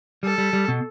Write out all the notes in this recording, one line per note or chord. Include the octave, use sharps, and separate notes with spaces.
G3 A4
G3
G3
B2